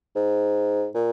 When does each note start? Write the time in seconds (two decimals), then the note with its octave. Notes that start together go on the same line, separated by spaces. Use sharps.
0.16 G#2
0.95 A#2